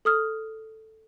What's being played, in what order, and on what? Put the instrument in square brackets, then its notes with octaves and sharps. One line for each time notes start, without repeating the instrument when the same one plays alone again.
[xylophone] A4 D#6 F6